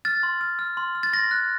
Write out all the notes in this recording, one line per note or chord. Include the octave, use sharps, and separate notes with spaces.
F6 A6
C6
F6
F6
C6
F6
A6
C6 A#6
F#6